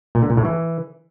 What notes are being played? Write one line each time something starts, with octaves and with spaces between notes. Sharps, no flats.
A#2
D3
A#2
A2
E3